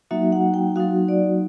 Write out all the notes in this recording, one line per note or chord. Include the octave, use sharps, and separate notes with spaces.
F#3 A#3 D#4 F#4 E5
F#5
G5
F#3 A#3 D#4 F#4 F5
D5